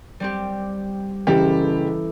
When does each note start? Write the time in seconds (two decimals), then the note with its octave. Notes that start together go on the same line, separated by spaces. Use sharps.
0.20 G3 C4 G4
1.27 F#1 C#3 E3 E4 G4 A4